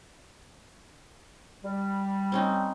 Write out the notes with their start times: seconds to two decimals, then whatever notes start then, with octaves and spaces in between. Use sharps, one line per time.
1.63 G3
2.32 C4 C#4 D#4